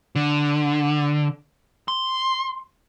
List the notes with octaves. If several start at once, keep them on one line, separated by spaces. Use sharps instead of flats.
D3
C6